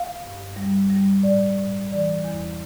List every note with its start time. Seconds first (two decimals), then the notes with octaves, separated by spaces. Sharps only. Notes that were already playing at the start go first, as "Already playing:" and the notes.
Already playing: F5
0.24 G2
0.56 G3
0.90 G3
1.23 A2 D5
1.58 A2
1.91 E3 D5
2.24 E2